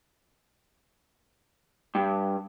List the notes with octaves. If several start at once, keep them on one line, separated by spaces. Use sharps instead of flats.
G2